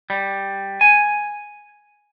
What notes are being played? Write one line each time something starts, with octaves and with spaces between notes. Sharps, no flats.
G3
G#5